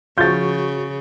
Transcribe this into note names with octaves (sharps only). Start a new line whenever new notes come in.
C#3 F3 F#4 C#6 G6 A6